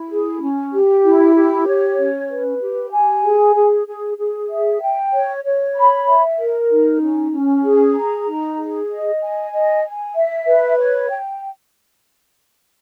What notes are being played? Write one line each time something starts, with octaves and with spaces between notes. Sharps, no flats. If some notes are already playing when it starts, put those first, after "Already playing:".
Already playing: E4
G#4
C#4
G4
E4
G4
C#5
C#4
B4
G4
G#5
G#4
G#4
G#4
G#4
E5
G5
C#5
C#5
B5
E5
A#4
D#4
C#4
C#4
G#4
A#5
D#4
G#4
D#5
G#5
D#5
G#5
E5
B4
C#5
G5